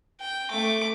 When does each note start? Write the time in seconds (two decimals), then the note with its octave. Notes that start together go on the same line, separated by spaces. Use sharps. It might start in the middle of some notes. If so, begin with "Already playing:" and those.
0.21 G5
0.51 A3 D6